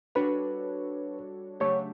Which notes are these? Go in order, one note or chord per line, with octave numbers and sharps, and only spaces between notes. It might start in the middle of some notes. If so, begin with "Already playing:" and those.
G3 D4 F#4 A4 B4 C#5
C#3 F#3 A3 D4 G4 C#5